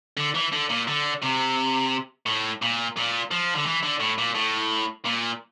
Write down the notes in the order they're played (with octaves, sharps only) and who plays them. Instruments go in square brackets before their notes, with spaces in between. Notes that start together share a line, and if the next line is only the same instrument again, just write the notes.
[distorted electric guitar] D3
E3
D3
A#2
D3
C3
A2
A#2
A#2
F3
D3
E3
D3
A2
A#2
A2
A#2